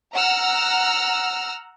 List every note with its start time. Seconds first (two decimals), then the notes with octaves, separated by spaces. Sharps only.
0.14 F#5 A#5 E6 F6